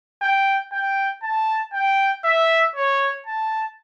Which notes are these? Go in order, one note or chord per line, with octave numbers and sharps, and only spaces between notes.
G5
G5
A5
G5
E5
C#5
A5